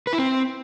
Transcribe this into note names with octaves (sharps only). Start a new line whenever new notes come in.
B4
E4
C4